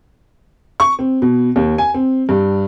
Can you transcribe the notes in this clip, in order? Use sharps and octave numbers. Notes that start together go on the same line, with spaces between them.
C#6
C4
B2
D#2
G#5
C4
G2